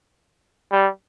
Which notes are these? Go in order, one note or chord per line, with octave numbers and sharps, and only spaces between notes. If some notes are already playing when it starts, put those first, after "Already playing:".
G3